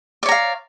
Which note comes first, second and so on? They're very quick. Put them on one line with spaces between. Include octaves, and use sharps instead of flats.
D5 C#5 A#5 F5